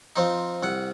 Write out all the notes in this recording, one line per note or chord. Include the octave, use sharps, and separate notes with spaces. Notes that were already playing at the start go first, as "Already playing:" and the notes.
F3 C4 D#4
C2 F#5